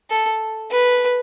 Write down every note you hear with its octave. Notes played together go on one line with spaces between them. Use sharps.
A4
B4